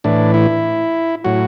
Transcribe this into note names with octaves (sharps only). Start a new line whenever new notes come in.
A2 E3 D4
E4
A2 F#3 F#4